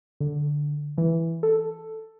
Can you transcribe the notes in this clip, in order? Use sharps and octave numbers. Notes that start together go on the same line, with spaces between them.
D3
E3
A4